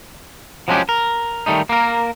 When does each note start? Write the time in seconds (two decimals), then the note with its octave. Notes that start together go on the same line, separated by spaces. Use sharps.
0.68 F3 F#3 G#3 C#4 D4 G4
0.89 A#4
1.46 D#3 G3 A3 D#4
1.69 A#3 A#4